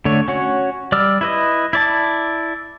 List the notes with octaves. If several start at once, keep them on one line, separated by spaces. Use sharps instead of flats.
D3 A3 C#5
C#4 F#4 C#5
G3 D5 D6 E6 F6
E4 B4 D#5
E4 D5 A5